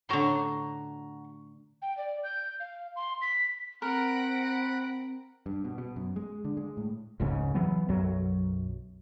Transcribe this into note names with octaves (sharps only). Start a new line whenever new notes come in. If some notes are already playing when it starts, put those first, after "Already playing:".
A2 D3 F#4 A#5 C6
G5
D5
G6
F5
C6
B6
C4 A#4 F#5 B5 F#6 A#6 D7
G2
B2
B2
F#2
G#3
D3
G#3
A2
F1 C#2 G#2 C#3
E3 F#3 B3
B1 F#2 F#3